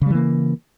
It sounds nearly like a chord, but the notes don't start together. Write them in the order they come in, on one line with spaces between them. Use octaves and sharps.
C#3 G3 E3 A#3